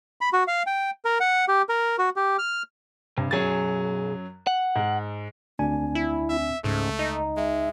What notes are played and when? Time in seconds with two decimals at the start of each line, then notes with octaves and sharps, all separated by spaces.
0.21 B5
0.33 F#4
0.48 F5
0.67 G5
1.05 A#4
1.20 F#5
1.48 G4
1.69 A#4
1.98 F#4
2.16 G4
2.38 F6
3.17 G2 C3
3.31 B1 F#2 F#3 G#4 A6
4.47 F#5
4.76 G#2
5.59 D2 C4 D4 G#5
5.95 E4
6.30 C4 E5
6.64 C#2 G#2 A3 C#4
6.99 D#4 D#5
7.37 G#3 E5